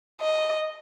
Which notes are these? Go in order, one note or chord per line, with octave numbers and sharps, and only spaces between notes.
D#5